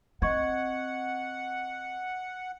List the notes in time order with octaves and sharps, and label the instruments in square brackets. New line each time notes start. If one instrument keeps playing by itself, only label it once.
[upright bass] C4 [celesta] D#5 C#6 G#6 [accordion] F#5